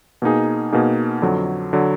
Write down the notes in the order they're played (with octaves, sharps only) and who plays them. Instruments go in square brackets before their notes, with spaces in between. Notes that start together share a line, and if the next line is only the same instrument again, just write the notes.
[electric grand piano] B2 A#3 D#4 G#4
B2 A#3 D#4 G#4
F2 D3 F#3
D3 F#3